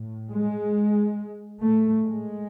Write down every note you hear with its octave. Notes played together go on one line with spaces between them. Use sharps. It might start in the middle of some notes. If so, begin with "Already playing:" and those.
Already playing: A2
G#3
A2 A3
G#3